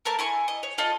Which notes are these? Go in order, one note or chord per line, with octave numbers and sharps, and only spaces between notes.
A3 A#4 A5
E4 G#5 C#6
D#5
C#5
F4 A4 D#5